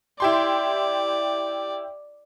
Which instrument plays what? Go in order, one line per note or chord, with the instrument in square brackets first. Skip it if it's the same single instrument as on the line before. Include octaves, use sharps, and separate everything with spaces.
[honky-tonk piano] E4 G4 C6 [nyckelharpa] D5